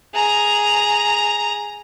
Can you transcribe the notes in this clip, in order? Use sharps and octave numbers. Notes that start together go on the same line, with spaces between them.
G#4 A#5